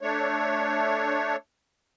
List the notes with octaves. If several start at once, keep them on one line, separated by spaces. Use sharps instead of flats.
A3 D4 C#5